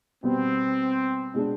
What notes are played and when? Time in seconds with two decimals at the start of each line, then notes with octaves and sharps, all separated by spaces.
0.23 B2 G3 B3 C4
1.34 B2 G#3 D4